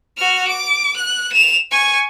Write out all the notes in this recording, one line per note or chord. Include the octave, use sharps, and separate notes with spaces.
F#4 F6
D6
F#6
E7 F7
G#5 C#6